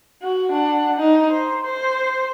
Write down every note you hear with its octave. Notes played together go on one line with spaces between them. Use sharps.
F#4
D4 F#5
D#4
C5
C5